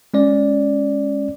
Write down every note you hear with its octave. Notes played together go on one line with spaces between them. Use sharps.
G#3 C#4 D5